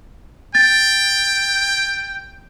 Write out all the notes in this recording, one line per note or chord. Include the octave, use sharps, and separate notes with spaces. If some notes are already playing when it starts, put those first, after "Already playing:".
G5 A6